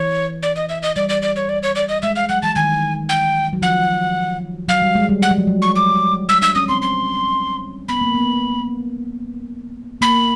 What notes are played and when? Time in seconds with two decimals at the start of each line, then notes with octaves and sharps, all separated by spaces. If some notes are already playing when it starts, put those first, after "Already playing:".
Already playing: E3 C#5
0.43 D5
0.56 D#5
0.69 E5
0.83 D#5
0.96 G3 D5
1.09 D5
1.22 D5
1.36 C#5
1.49 D5
1.63 C#5
1.76 D5
1.89 D#5
2.02 G#3 E5
2.16 F5
2.29 F#3 F#5
2.43 E3 A5
2.56 D#3 G#5
3.09 G5
3.53 F#3
3.62 F3 F#5
4.68 F#3 F5
4.82 G3
4.95 G#3
5.09 G3
5.22 G3 F#5
5.31 F#3
5.38 F3
5.47 F#3
5.62 C#6
5.76 D6
6.29 G#3 E6
6.42 D4 E6
6.55 C#4 D#6
6.69 C4 C6
6.82 C6
7.89 B3 B5
8.01 A#3
8.15 B3
10.01 A#3 B5